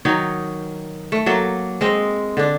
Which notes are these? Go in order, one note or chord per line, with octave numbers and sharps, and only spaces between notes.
D#3 F#3 D#4 C#5
A3
F#3 A#3 A4
G#3 C4 D#5
D3 D4